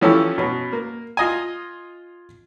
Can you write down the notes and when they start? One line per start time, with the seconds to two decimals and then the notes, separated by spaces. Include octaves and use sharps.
0.01 E3 F3 C#4 G4 A4 E6
0.38 B2 C#4
0.73 A#3
1.17 F4 D#5 G#5